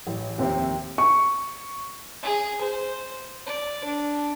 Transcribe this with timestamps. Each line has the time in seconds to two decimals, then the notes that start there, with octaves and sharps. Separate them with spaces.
0.07 A1
0.38 F1 D#2 C4 C5 E5
0.98 C#6
2.23 G#4
2.62 C5
3.46 D5
3.85 D4